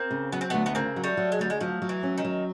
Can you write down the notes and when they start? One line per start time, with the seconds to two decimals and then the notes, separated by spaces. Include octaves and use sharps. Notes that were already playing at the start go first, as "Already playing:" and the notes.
Already playing: A#3 C4
0.11 C#3
0.32 F#3 B3
0.41 C4
0.50 D2 A3 B3
0.66 B3
0.75 C#3 A#3 C4
0.96 F#3
1.04 G3 A3
1.17 F#3
1.32 G#3
1.39 D2 G3
1.50 G#3
1.61 F3 F#3
1.82 F#3
1.89 E3
2.03 C#4
2.18 D#3
2.25 F#3